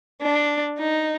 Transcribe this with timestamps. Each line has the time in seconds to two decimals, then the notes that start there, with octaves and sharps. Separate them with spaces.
0.22 D4
0.79 D#4